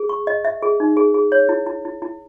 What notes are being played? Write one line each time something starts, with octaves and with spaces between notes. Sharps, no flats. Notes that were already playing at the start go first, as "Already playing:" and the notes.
Already playing: G#4
C#6
D#5
E5
G#4
D#4
G#4
G#4
C#5
E4
E4
E4
E4